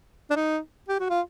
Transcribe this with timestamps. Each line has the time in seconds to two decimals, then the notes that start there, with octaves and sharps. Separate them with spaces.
0.30 D4
0.36 D#4
0.88 G4
1.00 F#4
1.10 F4